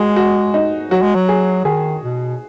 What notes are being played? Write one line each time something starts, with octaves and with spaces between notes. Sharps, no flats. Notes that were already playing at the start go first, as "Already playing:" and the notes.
Already playing: G#3 F#4 G#4
F#4
D#4
F#3 F#4
G#3
F#3
G#4
D#3 G#4
B2